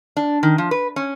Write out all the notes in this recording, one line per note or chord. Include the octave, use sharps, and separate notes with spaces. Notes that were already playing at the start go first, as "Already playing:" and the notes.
D4
D#3
F3
B4
C#4